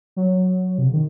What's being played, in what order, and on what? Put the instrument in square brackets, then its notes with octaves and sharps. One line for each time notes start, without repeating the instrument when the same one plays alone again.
[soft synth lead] F#3
C3
C#3
D#3